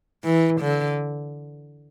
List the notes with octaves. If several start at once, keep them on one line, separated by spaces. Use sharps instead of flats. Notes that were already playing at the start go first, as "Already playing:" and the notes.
E3
D3